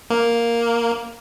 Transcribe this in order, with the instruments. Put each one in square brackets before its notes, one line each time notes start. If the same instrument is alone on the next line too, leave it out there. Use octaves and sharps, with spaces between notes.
[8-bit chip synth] A#3